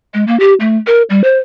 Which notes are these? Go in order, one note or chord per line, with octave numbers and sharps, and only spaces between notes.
G#3
A#3
G4
A3
A#4
G3
C5